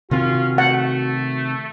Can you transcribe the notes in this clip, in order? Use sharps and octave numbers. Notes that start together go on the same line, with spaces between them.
C3 D#3 C4 C#4 F4 F#4
A3 F#5